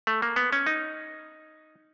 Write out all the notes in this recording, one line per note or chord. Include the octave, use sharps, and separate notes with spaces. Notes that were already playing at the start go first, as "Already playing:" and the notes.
A3
A#3
B3
C#4
D#4